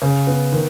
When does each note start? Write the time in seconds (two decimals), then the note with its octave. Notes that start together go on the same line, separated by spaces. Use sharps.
0.02 C#3
0.27 B3
0.52 D#3